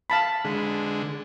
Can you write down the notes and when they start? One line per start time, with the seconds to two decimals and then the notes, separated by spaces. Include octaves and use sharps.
0.10 F5 A5 B5
0.45 D3 G#3